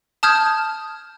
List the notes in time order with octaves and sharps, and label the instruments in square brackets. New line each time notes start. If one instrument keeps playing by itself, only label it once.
[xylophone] A5 D#6 F6 G6 G#6